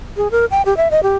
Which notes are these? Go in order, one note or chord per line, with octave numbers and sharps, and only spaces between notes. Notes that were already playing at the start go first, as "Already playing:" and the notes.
G#4
A#4
G5
G4
E5
D#5
G4